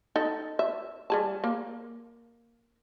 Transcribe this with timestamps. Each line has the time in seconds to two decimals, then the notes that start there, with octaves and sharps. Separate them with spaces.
0.16 D#4 A4
0.59 E5
1.10 G3 G#4 A5
1.44 A#3